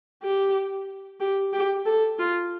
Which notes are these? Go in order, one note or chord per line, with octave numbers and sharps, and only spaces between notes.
G4
G4
G4
A4
F4